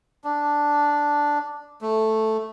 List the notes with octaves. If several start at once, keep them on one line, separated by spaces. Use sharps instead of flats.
D4
A3